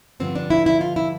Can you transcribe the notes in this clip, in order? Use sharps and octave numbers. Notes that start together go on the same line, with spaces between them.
G2 D3 F3 C4
D4
E4
E4
F4
E4